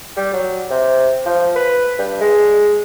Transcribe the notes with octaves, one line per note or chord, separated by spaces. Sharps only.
G3
F#3
C3
F3
B4
G2
G#3